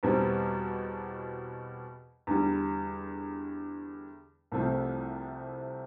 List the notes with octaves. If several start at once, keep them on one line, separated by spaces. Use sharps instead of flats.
E2 B2 G3 C4
E2 D3 G3
C2 C3 F3 A3 C4